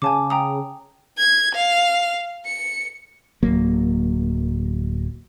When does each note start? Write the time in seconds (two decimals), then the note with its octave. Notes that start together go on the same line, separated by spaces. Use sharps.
0.02 C#3 G#5 A5 D6
0.30 G5 A#5 D#6
1.18 G#6
1.55 F5
2.46 C#7
3.43 D1 C2 F#3 A#3